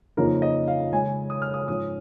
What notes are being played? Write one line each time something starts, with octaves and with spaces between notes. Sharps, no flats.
F2 C#3 F3 A#3 D#4 A#4
D#5
F5
C#3 G#3 C#4 G#5
D#6
F6
D#6
G#2 F3 C#4 D#6